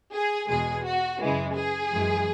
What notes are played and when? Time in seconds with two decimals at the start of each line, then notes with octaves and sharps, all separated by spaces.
0.14 G#4
0.49 E2 B2 G#3 G#4
0.84 F#4
1.21 F#2 C#3 E3 G#3
1.56 G#4
1.92 F#2 E3 G#3